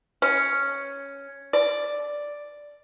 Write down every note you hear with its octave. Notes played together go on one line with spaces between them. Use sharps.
C#4
D5